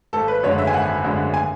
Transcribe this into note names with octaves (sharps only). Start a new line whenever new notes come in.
G#1 A4
B4
F#2 D3 G#3 C#5
E5
G#5
G#1 F#5
F#2 D3 G#3
G#5